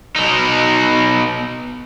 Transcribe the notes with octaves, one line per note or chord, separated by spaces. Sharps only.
B2 D#4